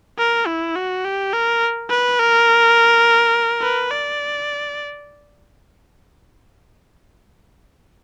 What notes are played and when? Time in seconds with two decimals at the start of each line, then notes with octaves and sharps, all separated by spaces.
0.19 A#4
0.47 E4
0.76 F#4
1.05 G4
1.33 A#4
1.90 B4
2.19 A#4
3.62 B4
3.91 D5